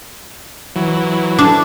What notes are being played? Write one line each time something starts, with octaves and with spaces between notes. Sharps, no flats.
E3 F#3
D4